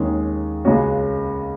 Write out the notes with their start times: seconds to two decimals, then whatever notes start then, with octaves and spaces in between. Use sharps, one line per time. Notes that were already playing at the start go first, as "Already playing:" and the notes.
Already playing: D#2 D#3 G#3 C#4 G#4
0.65 C#2 C#3 G#3 C#4 F#4